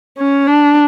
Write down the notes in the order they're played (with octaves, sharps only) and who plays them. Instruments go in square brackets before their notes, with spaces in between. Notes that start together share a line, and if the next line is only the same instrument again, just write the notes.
[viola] C#4
D4